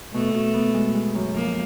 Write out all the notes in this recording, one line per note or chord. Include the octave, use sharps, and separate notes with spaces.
B2 A3
B2
B3
G#3
G#3
F#2
F3 A#3